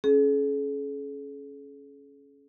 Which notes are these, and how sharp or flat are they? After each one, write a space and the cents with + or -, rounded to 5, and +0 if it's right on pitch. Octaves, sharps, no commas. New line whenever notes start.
C#4 +0 G#4 +45